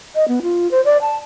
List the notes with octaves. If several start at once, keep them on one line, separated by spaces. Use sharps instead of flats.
D#5
B3
F4
C5
D5
A5